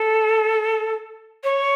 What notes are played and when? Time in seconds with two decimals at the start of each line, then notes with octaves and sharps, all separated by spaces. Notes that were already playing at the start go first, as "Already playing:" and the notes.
Already playing: A4
1.44 C#5